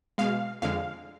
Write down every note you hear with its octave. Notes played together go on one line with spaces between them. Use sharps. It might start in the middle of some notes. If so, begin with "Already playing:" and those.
B2 G#3 F5
F2 D3 G#3 F5